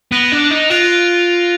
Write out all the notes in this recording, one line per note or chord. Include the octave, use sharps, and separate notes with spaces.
B3 F#6 A#6 D7 F7
D4
D#4
F4 F#6 A#6 D7 F7